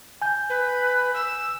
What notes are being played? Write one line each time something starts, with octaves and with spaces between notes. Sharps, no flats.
G#5 G6
B4
E6